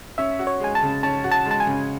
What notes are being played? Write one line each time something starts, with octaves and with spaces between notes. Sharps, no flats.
C#4 E5
F#4
C#5
G#3 G#5
A5
C#3
C#4 A5
F#4
A5
G#3
A5
G#5
C#3